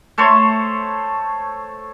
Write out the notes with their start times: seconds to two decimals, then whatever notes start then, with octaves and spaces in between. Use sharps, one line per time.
0.18 A3 A4 C5 C#5